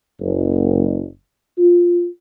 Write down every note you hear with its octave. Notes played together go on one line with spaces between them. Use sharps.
F#1
F4